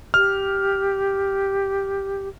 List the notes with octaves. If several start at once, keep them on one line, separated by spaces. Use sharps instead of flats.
G4 F6